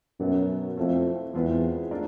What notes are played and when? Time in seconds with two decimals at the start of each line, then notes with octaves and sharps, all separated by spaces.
0.20 F#2 B2 F#3 B3 D#4
0.77 F2 A3 C4 E4
1.33 E2 G#3 C4 F4 G#4 B4
1.91 A3 D4 F4 A#4 D5